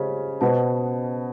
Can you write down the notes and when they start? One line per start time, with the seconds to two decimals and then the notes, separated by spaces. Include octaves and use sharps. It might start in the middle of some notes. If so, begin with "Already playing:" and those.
Already playing: C#3 C#4 G4 C5 D#5
0.41 B2 B3 C5 D#5 F#5 A5